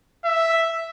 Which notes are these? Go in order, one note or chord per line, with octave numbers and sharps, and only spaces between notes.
E5